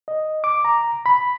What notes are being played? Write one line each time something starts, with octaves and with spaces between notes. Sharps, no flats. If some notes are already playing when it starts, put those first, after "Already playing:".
D#5
D6
A#5
B5